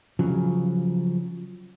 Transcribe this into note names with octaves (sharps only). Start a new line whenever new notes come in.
C#3 F3 F#3